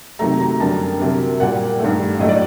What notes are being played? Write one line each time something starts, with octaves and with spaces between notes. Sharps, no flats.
C3 D#3 F#3 A3 A#5
A#5
F#2 D3 G3 A#3 A5
C3 F#3 A#3
A#2 G3 A#3 F#5
G2 D#3 A3
A2 F#3 A3 D#5
D5